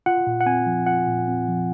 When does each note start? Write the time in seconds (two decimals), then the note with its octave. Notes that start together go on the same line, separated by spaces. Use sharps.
0.06 F4 F#5
0.27 A#2
0.41 F#5
0.46 C4 G#5
0.66 F3
0.87 F4 F#5
1.07 A#2
1.28 C4
1.48 F3